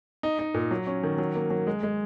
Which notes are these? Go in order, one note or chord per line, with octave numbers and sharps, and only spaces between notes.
D#4
D#4
A#2
F#3
C#4
D#3
F#3
A#3
F#3
G#3
G#3